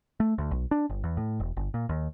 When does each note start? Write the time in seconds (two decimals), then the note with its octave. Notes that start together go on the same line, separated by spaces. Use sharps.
0.20 A3
0.38 D2
0.51 B1
0.71 D4
0.90 G1
1.04 E2
1.17 A2
1.40 E1
1.57 G1
1.74 A#2
1.89 D#2